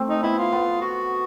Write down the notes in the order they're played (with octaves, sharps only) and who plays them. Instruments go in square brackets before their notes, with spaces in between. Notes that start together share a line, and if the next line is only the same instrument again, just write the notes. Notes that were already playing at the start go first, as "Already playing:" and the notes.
Already playing: [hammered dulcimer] A3 C4
[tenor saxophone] D#4
[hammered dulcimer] B3 [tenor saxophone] E4
[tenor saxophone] F4
[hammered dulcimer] B3
[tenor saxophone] F#4